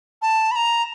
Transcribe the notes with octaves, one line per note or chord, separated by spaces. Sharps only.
A5
B5
A#5